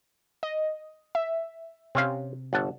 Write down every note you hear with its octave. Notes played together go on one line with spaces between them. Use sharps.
D#5
E5
C3 C4 C#4 F5
G1 F#5 A5